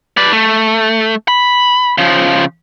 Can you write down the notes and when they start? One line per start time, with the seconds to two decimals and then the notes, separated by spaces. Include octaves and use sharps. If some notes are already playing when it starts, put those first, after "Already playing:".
0.17 B4 D5
0.32 A3
1.28 B5
1.98 C#3 F3